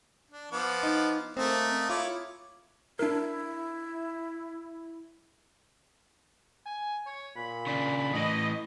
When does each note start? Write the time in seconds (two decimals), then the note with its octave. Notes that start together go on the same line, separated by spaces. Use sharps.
0.31 D4
0.52 F3 B3 D6
0.83 D#4
1.37 A3 A#3 C4 D#5
1.89 E4 F4 C#5 D6
2.99 D4 E4 A#4
6.66 G#5
7.07 C#5
7.37 A#2 B5
7.66 C#3 D4
8.14 A2 E3 D#5